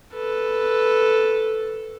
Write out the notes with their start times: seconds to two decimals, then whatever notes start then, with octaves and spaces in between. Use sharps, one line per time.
0.14 A4 B4